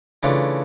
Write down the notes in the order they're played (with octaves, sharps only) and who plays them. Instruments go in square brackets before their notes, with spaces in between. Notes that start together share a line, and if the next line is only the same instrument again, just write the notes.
[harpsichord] C#3 E3 A3 D4 F4